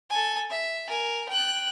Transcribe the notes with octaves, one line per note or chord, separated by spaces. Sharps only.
A4 G#5
E5
A#4 G#5
G5 F#6